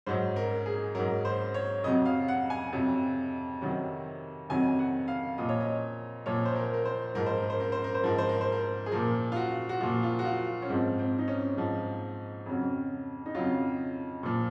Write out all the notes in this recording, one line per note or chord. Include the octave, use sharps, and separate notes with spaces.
G#2 F#3 C5
A#4
G#4
G#2 F#3 A#4
C5
C#5
F2 C3 F#3 D#5
F5
F#5
G#5
F2 C3 F#3
F2 C3 D#3 F#3
F2 C3 D#3 F#3 G#5
F#5
F5
A#2 F3 D#5
C#5
D#5
A#2 F3 C#5
C5
A#4
A#4
C5
G#2 F3 A#4
C5
A#4
C5
A#4
C5
A#4
C5
G#2 F3 A#4
C5
A#4
C5
A#4
G#4
A#2 F3 A#4
F4
F#4
F#4
A#2 F3 F4
F4
F#4
F4
C#4
G#2 F3 C4
C4
D#4
C#4
G#2 F3
F2 C#3 F#3
D#4
F2 C#3 F#3 F4
A#2 F3